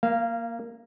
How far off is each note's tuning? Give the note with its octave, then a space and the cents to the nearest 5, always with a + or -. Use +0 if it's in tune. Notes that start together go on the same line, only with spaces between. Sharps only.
A#3 +0 F5 -20